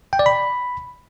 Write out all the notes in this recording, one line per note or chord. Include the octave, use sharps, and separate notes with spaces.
G5
D5
B5